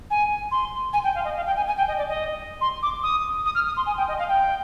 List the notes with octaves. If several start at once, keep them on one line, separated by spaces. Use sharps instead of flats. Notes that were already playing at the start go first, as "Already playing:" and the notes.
G#5
C6
G#5
G5
F5
D#5
F5
G5
G#5
G#5
G5
D#5
D5
D#5
C6
D6
D#6
D#6
F6
D#6
C6
G#5
G5
D#5
F5
G5